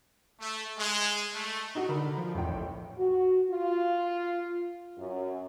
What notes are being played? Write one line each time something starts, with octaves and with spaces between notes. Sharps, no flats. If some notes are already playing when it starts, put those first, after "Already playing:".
A3
G#3
A3
D#4 F#4 D#5
D3 A#4 B5
D3
F3
A1 E2 A2 G5
A#1
F#4
F4
F#2